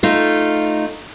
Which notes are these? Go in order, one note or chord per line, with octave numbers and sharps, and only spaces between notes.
A3 D#4 F4